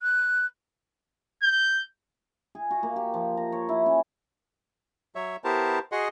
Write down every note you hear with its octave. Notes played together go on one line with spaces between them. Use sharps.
F#6
G6
G#4
F#4
A#3
G4
F3
A#5
C#5
E4
C#4
F#3 C#5 E5
B3 E4 G4 A#4 C5 A5
F#4 G#4 D#5 F#5 C6